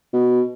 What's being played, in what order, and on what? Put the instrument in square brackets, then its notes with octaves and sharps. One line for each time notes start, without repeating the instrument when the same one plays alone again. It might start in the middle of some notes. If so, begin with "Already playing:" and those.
[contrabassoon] B2